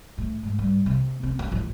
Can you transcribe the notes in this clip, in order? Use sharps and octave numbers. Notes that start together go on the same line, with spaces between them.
A2
G#2
G2
C3
C4
C#4
A1